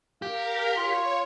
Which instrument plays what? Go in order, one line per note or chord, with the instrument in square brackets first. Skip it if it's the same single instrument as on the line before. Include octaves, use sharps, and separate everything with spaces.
[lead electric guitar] G4 [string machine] A#4 [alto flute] F5
[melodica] F4 [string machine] C#5